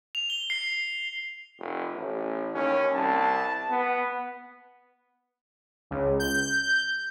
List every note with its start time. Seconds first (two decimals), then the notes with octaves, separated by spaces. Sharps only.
0.15 F7
0.30 G7
0.50 C7
1.59 F1
1.94 A1
2.54 D#2 C#4
2.94 C2 A5
3.70 B3
5.91 C#2
6.20 G6